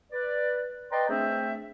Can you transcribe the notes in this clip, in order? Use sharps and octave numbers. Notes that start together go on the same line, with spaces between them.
B4 D5
B4 D5 D#5 G5 A#5 C6
A3 C4 D4 G#4 C5 E5